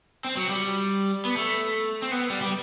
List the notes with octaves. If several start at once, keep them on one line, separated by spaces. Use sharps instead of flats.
C4
F#3
G3
B3
A3
C4
B3
G3
G3